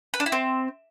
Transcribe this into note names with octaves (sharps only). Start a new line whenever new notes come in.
B4
D4
E4
C4